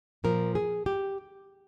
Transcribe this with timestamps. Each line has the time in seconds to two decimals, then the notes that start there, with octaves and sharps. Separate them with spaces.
0.24 A#2 F3 A#4
0.55 G#4
0.86 G4